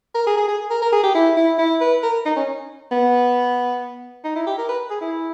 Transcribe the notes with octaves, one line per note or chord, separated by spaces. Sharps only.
A#4
G#4
G#4
G#4
A#4
A#4
G#4
G4
E4
E4
E4
B4
A#4
D#4
C#4
B3
D#4
E4
G4
A#4
B4
G#4
E4